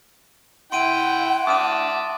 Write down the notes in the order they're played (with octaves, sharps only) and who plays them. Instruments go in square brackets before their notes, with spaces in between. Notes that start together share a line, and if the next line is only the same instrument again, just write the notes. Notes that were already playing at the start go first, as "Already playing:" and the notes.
[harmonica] E4 G5 [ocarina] F#5 [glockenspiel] C6 D7 D#7
[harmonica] E5 A5 D6 [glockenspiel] D#6 F6 D#7